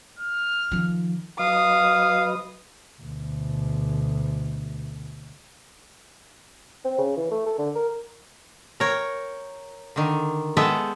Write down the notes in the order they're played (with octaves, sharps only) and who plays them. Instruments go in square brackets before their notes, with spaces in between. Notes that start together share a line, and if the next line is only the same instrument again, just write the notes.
[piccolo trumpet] F6
[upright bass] D#3 F3
[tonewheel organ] F#3 B4 D#5 [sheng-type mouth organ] F5 [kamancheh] D#6
[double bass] D2 B2
[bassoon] C4
C#3
E3
A3
A4
D3
A#4
[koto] A#4 C#5 G5
D3 D#3
G#3 B3 A4 E5 G5